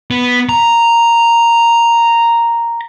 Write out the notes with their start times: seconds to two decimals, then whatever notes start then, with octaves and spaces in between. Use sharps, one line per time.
0.11 B3
0.49 A#5